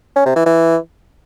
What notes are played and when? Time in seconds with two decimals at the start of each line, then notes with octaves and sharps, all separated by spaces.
0.16 C#4
0.26 C3
0.36 E3
0.46 E3